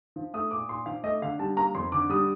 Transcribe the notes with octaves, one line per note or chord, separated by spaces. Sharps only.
F3
A3 D#6
A#2 D6
A#2 C6
F3 F5
A3 D#5
D3 F5
G3 A5
A#3 A#5
F2 C6
D3 D6
G3 D#6